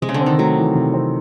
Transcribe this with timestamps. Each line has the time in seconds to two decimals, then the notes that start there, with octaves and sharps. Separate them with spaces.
0.02 C3 G#3
0.09 C#3
0.14 D3
0.21 C4
0.26 D#3
0.38 F#3 A3
0.56 E3
0.75 C3
0.94 C4